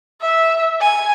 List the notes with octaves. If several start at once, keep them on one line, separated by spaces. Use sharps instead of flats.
E5
G#5